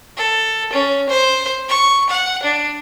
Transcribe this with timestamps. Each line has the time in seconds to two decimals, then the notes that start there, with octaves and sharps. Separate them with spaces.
0.17 A4
0.73 C#4
1.09 C5
1.69 C#6
2.10 F#5
2.43 D4